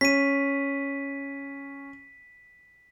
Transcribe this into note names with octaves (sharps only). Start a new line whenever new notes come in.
C#4 B6 D#7